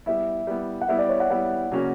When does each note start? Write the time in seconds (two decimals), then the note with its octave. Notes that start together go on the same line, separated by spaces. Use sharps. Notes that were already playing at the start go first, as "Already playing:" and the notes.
0.06 G3 B3 E4 E5
0.47 G3 B3 E4
0.81 F#5
0.88 G3 B3 E4 E5
0.99 D5
1.09 C#5
1.20 F#5
1.30 G3 B3 E4 F#5
1.72 C#3 F#3 A#3 C#4 F#4